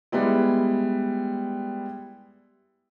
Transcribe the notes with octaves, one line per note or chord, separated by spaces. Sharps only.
G3 G#3 B3 E4